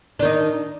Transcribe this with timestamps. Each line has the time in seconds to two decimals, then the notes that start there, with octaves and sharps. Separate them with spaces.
0.19 D4
0.22 D#3
0.25 D#4